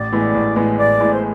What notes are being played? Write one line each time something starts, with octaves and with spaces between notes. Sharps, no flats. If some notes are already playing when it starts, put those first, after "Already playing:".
Already playing: A1 D5
A2 E3 G#3 B3
A1
A2 E3 G#3 B3
A1 D5
A2 E3 G#3 B3
C5